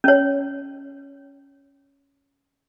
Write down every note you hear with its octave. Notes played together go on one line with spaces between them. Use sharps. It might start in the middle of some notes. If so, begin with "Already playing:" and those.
C#4 C#5